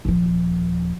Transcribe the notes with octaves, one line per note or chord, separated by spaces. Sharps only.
D#1 F3